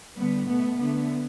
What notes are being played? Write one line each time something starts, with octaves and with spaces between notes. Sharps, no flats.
D3 G3 B3
B2 A3 B3
D3 A3 B3